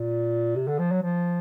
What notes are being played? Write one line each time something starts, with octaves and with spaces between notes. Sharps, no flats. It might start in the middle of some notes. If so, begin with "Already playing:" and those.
Already playing: A#2
C3
D3
F3
F#3
F3